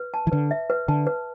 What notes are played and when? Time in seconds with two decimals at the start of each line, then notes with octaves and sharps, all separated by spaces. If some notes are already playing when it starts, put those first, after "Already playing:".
Already playing: B4
0.14 A5
0.27 E3
0.32 D3 B4
0.51 E5
0.70 B4
0.88 D3 A5
1.07 B4